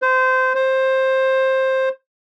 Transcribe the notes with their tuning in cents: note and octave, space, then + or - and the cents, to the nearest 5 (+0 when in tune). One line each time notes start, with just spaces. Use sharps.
C5 -20
C5 +15